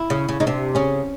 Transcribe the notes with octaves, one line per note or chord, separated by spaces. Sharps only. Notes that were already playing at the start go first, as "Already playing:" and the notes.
Already playing: E4
C#3
C#3
C#3 D#4
C3 D4
C#3 C#4